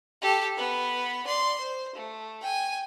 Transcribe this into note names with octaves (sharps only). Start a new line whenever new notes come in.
G4 A4
B3 B4
D5 C6
C5
A3
G5 G#5